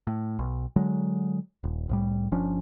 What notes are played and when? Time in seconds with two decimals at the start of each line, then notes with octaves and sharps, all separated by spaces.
0.07 A2
0.39 B1
0.76 D3 F#3 G#3
1.64 D#1
1.89 C2 A2 G3
2.32 G1 F3 C#4 D4